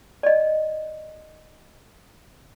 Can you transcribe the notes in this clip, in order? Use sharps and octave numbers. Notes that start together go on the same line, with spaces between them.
D5 D#5